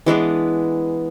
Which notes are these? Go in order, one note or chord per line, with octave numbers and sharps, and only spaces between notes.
E3 G#3 B3 D4